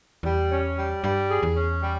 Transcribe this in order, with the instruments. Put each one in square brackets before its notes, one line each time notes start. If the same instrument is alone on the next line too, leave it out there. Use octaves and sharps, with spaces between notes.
[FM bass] E2 [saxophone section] G3
[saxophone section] C#4
G3
[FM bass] G2 [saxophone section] G3
[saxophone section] G#4
[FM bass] E2
[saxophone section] C#4
G3